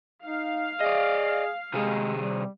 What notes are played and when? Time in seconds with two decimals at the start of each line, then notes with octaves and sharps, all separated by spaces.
0.24 D#4 F5
0.80 G#4 D5 D#5
1.74 C3 G#3 G#4
2.19 G3